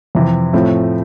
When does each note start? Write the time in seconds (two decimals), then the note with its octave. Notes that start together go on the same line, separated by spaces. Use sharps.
0.15 F2 C3 E3
0.53 A2 F3 A3 C4